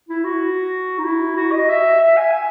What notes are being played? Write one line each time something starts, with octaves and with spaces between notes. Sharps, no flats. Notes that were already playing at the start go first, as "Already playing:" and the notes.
E4
F#4
D#4
E4
F#4
D#5
E5
E5
G#5
G#5